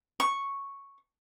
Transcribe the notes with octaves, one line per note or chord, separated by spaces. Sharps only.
C#6